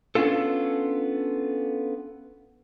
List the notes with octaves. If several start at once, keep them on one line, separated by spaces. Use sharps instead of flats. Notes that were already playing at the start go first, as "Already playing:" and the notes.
B3 C#4 D4 F4 A4